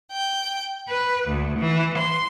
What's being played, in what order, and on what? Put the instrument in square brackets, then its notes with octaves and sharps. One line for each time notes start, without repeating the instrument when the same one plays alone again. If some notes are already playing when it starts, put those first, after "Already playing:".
[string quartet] G5
B4
D2
E3
C6